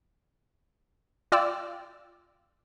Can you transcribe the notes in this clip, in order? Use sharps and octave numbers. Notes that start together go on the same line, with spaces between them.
F4 D5 G5 E6